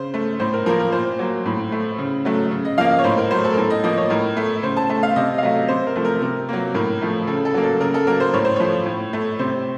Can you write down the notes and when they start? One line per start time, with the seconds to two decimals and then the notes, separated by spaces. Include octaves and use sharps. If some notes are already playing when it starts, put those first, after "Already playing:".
Already playing: C#3 C5
0.14 A3
0.40 A2 C5
0.53 A#4
0.66 F3 A#3 A#4
0.79 A#4
0.92 A#2 C5
1.19 F#3 A#3
1.46 A2
1.72 A3
1.98 C#3
2.25 F#3 A3
2.51 C#3
2.65 D#5
2.78 F3 A#3 F5
2.91 D#5
2.99 C#5
3.04 A2 C5
3.18 A#4
3.31 F#3 A3 C5
3.44 A4
3.53 A#4
3.57 A2 A4
3.70 D#5
3.84 F3 A#3 D#5
3.97 C#5
4.10 A2 A#4
4.37 A3
4.63 C#3 C5
4.77 A5
4.89 A3 A5
5.03 F5
5.16 C3 D#5
5.38 F5
5.42 F#3 A3 D#5
5.68 C3 C5
5.87 A#4
5.96 F3 A3
6.05 A#4
6.22 C3 A#4
6.49 F#3 A#3
6.74 A2 A#4
7.02 F3 A3
7.27 C#3 A4
7.45 A4
7.54 F#3 A#3
7.63 A4
7.80 C#3 A#4
7.94 A4
8.07 F#3 A#3 A#4
8.20 C5
8.34 A2 C#5
8.45 C5
8.56 F3 A3 C#5
8.86 A2
9.13 A3
9.39 C3 C5